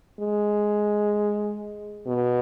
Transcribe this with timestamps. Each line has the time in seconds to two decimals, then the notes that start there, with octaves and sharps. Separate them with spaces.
0.20 G#3
2.07 B2